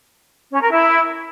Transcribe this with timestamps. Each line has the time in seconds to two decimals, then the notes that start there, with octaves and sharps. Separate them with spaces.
0.52 C#4
0.61 A#4
0.71 E4